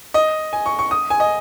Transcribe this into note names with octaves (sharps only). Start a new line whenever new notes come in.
D#5
G#5
C#6
C#6
D#6
G#5
D#5